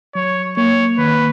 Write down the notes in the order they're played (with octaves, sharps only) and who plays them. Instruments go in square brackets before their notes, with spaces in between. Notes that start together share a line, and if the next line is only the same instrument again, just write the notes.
[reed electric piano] F#3 [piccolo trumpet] C#5
[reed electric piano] A#3 [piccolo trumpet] C#5
[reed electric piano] D#3 [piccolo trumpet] B4